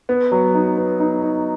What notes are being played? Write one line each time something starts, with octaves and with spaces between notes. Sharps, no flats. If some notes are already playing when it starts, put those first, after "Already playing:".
B3
F#3
D#4
B3
D#4
D#4